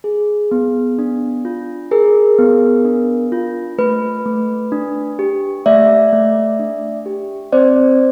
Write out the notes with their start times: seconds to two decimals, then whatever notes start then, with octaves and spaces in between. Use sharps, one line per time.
0.04 G#4
0.51 B3
0.99 D4
1.45 F4
1.91 G#4 A#4
2.38 B3
2.85 D4
3.32 F4
3.78 A3 B4
4.25 A3
4.72 D4
5.19 G4
5.66 A3 D5 E5
6.13 A3
6.60 D4
7.06 G4
7.52 C4 C5 D5